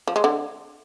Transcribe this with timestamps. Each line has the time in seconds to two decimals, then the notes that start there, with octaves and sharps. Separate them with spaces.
0.07 F3
0.16 G#3
0.24 D3